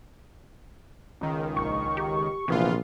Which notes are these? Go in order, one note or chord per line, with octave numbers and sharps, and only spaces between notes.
C#2 D#3
A#1 C#6
G4
A#1 C3 E3 B3 F4